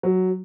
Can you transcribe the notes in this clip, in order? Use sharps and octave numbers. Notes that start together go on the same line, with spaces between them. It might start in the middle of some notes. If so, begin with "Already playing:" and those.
F#3